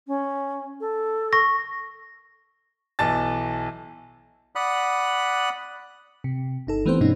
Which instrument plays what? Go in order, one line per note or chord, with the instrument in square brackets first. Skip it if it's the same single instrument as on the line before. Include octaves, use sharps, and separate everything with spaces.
[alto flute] C#4
A4
[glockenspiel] C#6 A#6
[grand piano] B1 E3 A5 A6
[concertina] D5 F#5 B5 D#6 F#6
[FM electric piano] C3
G1 D#4 A4
E3 A3 B3 C4 G4 C5
G2 B2 E3 A3 C#4 D#4